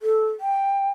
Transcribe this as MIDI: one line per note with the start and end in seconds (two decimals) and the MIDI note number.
0.02 0.27 69
0.40 0.88 79